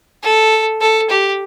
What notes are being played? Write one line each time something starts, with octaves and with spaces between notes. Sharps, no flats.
A4
A4
G4